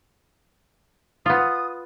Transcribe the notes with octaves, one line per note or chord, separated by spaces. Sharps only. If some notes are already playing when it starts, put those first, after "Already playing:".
B3 F4 D#6